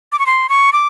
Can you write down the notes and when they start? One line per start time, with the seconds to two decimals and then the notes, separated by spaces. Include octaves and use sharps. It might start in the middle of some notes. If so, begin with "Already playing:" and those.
0.12 D6
0.19 C#6
0.26 C6
0.49 C#6
0.73 D6